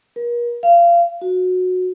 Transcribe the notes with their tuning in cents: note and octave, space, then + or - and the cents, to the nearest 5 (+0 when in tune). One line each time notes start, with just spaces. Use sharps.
A#4 +40
F5 -25
F#4 -15